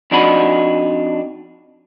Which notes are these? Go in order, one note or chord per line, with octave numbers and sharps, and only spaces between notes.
F2 D4 D#4 F#4 B5